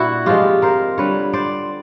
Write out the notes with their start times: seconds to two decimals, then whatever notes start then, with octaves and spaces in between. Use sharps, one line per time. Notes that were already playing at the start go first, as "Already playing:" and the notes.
Already playing: A#2 D4 E4 F#4
0.26 C3 F3 G#3 F4 G4
0.62 A#4 C5
0.98 D3 G3 B4 C#5
1.33 C5 D5